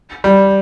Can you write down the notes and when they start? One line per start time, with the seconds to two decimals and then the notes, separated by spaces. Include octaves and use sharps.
0.24 G3